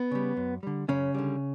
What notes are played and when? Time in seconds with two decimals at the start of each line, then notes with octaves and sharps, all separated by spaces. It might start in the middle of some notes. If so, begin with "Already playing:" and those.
Already playing: B3
0.11 C#3 G3
0.37 F#2
0.63 D3 G3
0.88 F#2 C#3 C#4
1.14 D3 G3